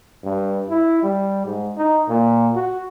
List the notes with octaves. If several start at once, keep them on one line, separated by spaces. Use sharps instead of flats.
G2
E4
G3
G#2
D#4
A#2
F#4